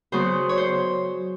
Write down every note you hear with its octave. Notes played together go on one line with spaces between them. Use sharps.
C#3 F#3 B3 C5
C#5
C5